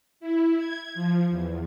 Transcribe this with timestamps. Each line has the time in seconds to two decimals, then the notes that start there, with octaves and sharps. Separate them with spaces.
0.20 E4
0.57 G#6
0.95 F3
1.31 E2